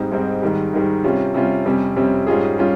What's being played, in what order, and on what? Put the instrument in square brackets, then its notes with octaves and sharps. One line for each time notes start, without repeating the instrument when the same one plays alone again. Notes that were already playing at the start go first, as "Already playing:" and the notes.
Already playing: [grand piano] G#2 G3 C4 D#4
G#2 G3 C4 D#4
G#2 D#3 G3
G#2 D#3 G3
C3 G3 C#4 F4
C3 G3 C#4 F4
F2 C3 G3 C#4
F2 C3 G3 C#4
G#2 G3 C#4 F4 G#4
G3 C#4 F4